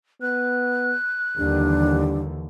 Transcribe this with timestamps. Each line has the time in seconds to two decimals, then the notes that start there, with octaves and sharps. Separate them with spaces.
0.22 B3 F#6
1.38 D#2 D3 E3 G3 D4